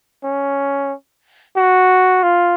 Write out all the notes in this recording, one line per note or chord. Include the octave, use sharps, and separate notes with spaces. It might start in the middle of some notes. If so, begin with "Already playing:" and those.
C#4
F#4
F4